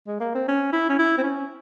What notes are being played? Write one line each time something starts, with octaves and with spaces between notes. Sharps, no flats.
G#3
A#3
C4
C#4
E4
C#4
E4
C4
C#4